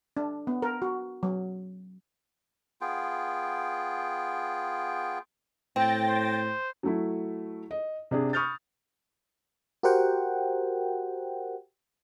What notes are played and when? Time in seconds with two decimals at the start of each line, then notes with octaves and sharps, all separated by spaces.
0.17 D4
0.47 B3
0.62 A#4
0.82 F#4
1.23 F#3
2.81 B3 F4 G#4 G5
5.76 A2 C4 G5 A6 A#6
6.08 C5
6.83 F#3 A3 E4
7.71 D#5
8.11 C3 D4 G#4
8.33 B5 C#6 D#6 F6 G6 A6
9.83 F#4 G4 A#4 C5 F#5 G5